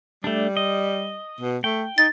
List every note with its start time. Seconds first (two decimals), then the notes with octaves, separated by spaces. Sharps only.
0.24 G3 A3 D4
0.57 D#5
1.41 B2
1.64 A3 G5
1.98 D#4 A6